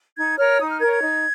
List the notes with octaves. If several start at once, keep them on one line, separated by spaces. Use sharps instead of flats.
D#4 G#6
A#4 C#5 F6
D#4 D#6
F6
A#4 C#5 G#6
G#6
D#4